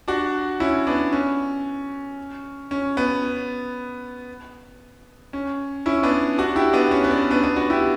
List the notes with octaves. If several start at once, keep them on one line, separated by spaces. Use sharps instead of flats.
D4 F#4
C#4 E4
B3 D4
C#4
C#4
B3
C#4
C#4 E4
B3 D4
D4 F#4
E4 G4
B3 D4
C#4
B3
D4
C#4
B3 D4
B3 D4
D4 F#4
E4 G4